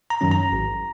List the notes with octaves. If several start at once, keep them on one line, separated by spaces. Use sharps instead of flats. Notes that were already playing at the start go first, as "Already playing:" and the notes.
A#5
F#2 D#3 F#3 C#4
A#5
G#1